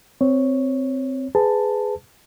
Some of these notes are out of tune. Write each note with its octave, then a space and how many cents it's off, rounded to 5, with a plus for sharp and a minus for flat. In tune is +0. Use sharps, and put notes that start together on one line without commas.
C4 -5 C#5 +0
G#4 +5 B4 +20 A5 +10